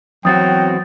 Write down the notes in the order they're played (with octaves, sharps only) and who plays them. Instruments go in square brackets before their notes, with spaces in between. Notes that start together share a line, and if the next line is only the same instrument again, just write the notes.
[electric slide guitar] E2 C4 F#4 [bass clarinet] F#3 [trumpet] G5 [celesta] D#6 A6